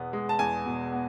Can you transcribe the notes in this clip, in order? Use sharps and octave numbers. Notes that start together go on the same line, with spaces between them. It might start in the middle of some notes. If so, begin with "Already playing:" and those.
Already playing: E2 B2 B3
G#3
A5
E2 G#5
B2
B3